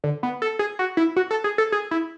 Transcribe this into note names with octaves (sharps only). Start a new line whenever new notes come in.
D3
B3
A4
G#4
F#4
E4
F#4
A4
G#4
A4
G#4
E4